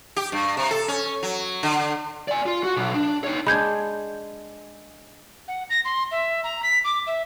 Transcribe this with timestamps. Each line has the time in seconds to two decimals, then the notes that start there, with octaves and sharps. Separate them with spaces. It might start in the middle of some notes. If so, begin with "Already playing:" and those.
0.16 G4
0.32 G2
0.57 C3
0.71 A4
0.88 C#4
1.23 F#3
1.63 D3
2.28 D5 G#5
2.46 F4
2.63 F#4
2.76 B1
2.94 D4
3.24 D#4 C#5
3.47 G#3 D4 B5 G6 G#6
5.48 F#5
5.69 A#6
5.85 C6
6.11 E5
6.44 A#5
6.62 B6
6.84 D6
7.06 E5